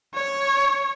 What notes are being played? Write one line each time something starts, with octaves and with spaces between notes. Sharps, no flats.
C#5